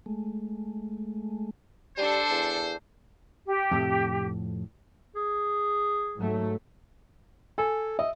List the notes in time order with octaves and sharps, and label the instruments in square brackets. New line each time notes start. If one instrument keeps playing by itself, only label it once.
[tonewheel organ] G#3 A3
[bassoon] G3 [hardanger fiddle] D4 A4 [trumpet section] C5
[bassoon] E2
[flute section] G4
[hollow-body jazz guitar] F2 A2 C3
[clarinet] G#4
[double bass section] G#2 F#3 A3
[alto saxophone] A4 [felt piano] G#5
[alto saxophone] D#5 [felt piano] E5